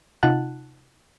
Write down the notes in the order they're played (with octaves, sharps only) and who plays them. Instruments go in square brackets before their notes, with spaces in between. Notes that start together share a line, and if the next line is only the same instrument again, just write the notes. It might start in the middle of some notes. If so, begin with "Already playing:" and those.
[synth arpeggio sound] C3 D#4 F4 F#5 A5 F#6